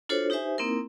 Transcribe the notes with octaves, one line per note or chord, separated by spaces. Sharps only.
D4 F4 F#4 A4 C5 C#5
D#4 G4 B4 C5 E5 G#5
A#3 C4 D#4 E4 A#4